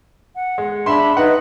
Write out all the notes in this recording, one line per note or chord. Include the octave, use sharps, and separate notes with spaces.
F#5
G#3
D4 E5 B5 C6
D#4 B4 D#5 F#5